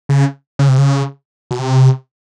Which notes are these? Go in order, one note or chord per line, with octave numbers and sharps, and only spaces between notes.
C#3
C#3
C3
C#3
B2
C3